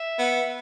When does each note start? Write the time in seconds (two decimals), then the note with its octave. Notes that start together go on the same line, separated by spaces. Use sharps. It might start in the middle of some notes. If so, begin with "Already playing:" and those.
Already playing: E5
0.19 B3